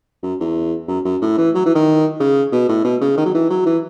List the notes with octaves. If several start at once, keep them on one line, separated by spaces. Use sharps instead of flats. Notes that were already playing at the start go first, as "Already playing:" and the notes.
F#2
E2
F#2
F#2
A2
E3
F#3
E3
D#3
C#3
B2
A2
B2
C#3
D#3
F#3
E3
F#3
E3